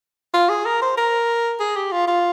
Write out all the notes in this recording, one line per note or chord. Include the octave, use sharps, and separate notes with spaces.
F4
G#4
A#4
C5
A#4
G#4
G4
F4
F4